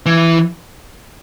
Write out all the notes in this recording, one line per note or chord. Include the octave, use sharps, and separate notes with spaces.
E3